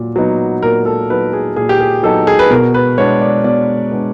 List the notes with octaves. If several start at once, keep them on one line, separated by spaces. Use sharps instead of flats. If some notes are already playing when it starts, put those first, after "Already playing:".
Already playing: A#2 F#3
F#3 B3 D#4
A#2 A#4
A4
F#3 B3 D#4 B4
G#4
A#2 G#4
G4
G#4
F#3 B3 D#4 A4
G#4
B4
B2 A#4
B4
G#3 B3 D4 C#5
D5
B2 D5
G#3 B3 D4